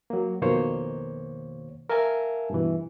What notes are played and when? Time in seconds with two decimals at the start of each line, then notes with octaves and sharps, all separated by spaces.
0.10 F#3 A#3
0.42 F2 B2 D#3 A#3 C5 C#5
1.90 A#4 E5 F5 G#5 A5
2.50 G2 B2 E3